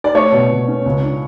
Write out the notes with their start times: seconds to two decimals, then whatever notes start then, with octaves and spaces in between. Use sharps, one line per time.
0.04 D5
0.15 A3 C#5
0.32 B2
0.50 B2
0.68 C#4
0.86 C#2
1.03 D4